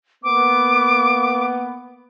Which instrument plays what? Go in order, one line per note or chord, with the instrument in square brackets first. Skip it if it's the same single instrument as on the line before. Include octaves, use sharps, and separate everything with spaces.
[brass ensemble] A#3 B3 [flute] D6